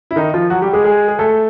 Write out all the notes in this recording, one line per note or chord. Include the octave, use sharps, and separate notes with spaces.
E4
D#3 D#4
F3 F4
F#3 F#4
G3 G4
G#3 G#4
G#3 G#4
G#4
A3 A4